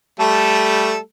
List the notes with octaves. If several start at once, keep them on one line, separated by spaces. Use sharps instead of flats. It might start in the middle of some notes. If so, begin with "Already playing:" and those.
G3 A3 A4